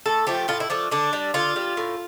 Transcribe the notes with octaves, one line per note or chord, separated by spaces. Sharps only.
A2 A4
F3 A3 G4
A2 F4
E4
F3 A3 D4
D3 D4
G3
D3 F4
G3
A2